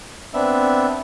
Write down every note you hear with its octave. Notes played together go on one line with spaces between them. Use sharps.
B3 C4 D4 E5